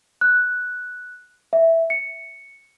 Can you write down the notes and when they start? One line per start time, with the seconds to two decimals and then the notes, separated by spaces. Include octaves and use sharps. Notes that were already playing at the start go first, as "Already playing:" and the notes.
0.21 F#6
1.53 E5
1.90 C#7